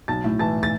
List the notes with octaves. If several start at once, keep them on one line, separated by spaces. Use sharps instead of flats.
B1 A5 A6
A2
E3 A5 A6
A6